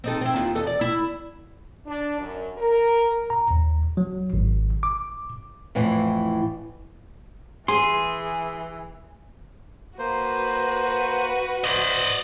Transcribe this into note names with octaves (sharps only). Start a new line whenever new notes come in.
C4 D#4 A4
C4 E4
D#2 D#3 F4
E2 A4 D#5
D5
E4
D4
F#2
A#4
A#5
D#2
F#3
G#1
D6
F2 A2 E3
E3 G#4 C6
A#3 F#4 B4 C5
C5 D5 D#5 F#5